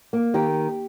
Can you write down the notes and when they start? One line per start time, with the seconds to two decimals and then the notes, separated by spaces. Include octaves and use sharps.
0.13 A#3
0.34 D#3 G4